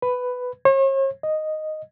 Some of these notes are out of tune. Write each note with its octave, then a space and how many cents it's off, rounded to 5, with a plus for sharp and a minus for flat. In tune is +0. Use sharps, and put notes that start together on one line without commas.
B4 +10
C#5 -45
D#5 -5